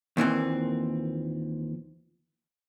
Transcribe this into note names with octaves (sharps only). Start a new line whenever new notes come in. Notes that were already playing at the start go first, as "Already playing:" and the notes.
D#2 A#2 E3 C4